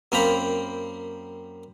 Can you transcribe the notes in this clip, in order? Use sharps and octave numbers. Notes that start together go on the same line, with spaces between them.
F#2 A#3 C4 G5 A#5 B5